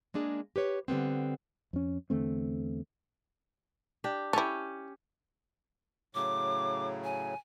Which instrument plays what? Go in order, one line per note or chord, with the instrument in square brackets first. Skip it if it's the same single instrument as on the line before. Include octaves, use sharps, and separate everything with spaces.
[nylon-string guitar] G#3 A#3 D4 G#4
G4 B4 C#5
D3 G3 B3 C4
[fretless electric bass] F2 C#4
E2 D3 A3 C4
[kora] D4 G4
[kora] C#4 G4 [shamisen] E4 A4
[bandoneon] A2 C#3 F#3 [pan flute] D6
[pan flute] G#5